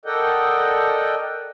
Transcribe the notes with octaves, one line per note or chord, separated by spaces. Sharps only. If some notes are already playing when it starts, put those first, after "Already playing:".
A4 A#4 D5 D#5 F#5 G5